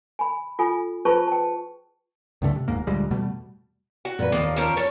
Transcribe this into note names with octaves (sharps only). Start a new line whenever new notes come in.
G#5 B5
F4 A4 G#5
F4 G#4 B4 C5 A5 C#6
G5 A5
C#2 G2 D3 A3
C3
D#1 D#2 G#2 A#3
D2 A#2 G3 G#3
E2 B2 G3 A3
F#4
A#2 B4
D#2 F3 A#3
F3 C#4 A#4
A4 C#5